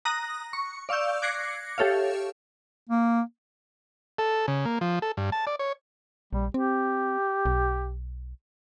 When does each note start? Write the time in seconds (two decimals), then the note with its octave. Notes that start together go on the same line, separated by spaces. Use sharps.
0.05 A#5 D#6 F#6 A#6
0.53 C#6
0.89 D5 F5 C#6 E6 G6
1.22 D6 F#6 G#6 A#6 C7 C#7
1.78 G4 A4 C#5 E5 F5
2.89 A#3
4.19 A4
4.48 C#3
4.65 A#3
4.81 F3
5.02 A4
5.17 G2
5.32 A5
5.47 D5
5.59 C#5
6.33 A#1 G3
6.54 C4 G4
7.45 B1